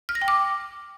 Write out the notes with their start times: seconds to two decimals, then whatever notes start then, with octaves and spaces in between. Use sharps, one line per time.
0.09 F6
0.15 A#6
0.22 G5
0.28 D6